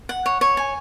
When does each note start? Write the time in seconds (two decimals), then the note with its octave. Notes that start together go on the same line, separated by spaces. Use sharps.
0.09 F#5
0.26 C#5
0.41 C#5
0.57 G#5